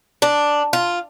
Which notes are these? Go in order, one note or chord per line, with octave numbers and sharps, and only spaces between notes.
D4
F4